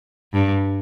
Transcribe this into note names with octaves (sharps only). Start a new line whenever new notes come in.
G2